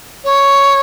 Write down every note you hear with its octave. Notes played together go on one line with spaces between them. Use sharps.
C#5